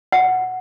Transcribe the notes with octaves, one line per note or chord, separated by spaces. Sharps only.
F#5